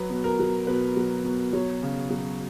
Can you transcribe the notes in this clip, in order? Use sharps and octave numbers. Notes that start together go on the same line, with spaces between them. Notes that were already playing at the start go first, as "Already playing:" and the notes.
Already playing: F#3 B4
B2
A#4
F#3
B2 B4
F#3
B2
F#3 C#5
C#3
F#3